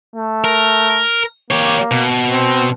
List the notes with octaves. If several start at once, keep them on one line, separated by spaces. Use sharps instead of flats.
A3
A#4
A#3 G4 C#5
B2
C4